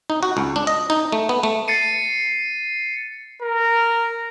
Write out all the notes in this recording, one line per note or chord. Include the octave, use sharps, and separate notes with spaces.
D#4
F#4
C#2
D4
D#5
D#4
A3
B3
A3
A6 C7 C#7 D#7
A#4